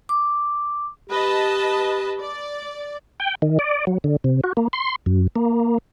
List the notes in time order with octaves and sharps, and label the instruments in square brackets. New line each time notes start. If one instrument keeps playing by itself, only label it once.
[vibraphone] D6
[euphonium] G4 [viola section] B4 D#5 A5
[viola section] D5
[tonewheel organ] G5
D#3
D5
F#3
D3
C3
F#4
A#3
C6
F#2
A#3